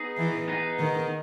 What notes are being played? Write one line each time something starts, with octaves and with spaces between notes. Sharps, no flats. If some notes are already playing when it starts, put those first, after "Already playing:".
Already playing: B3 D#4 G#4
E3
B3 D#4 G#4
D#3